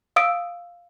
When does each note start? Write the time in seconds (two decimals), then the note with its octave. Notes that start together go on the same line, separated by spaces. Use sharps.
0.16 F5 D#6 E6 D7